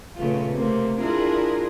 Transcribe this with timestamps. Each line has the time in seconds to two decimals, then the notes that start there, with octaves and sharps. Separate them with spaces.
0.16 A#2 C#3 A3 B3 F4
0.51 C3 A3 A#3 C4
1.00 D4 E4 F4 G#4 A#4